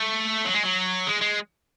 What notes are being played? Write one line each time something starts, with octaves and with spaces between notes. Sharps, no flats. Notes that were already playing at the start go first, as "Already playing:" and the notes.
Already playing: A3
F#3
G#3
F#3
G#3
G#3